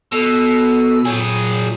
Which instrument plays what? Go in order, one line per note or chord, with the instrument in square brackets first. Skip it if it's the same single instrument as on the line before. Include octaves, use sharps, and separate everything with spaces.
[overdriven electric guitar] B2 [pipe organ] A4 E6
[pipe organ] A#2 [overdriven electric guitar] F#3 G#4